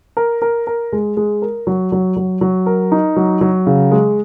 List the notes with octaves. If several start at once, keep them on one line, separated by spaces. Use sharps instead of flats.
A#4
A#4
A#4
G#3
G#3
A#4
F#3
F#3
F#3
F#3
A#4
D#4
F#3
F#3
C#3
G#3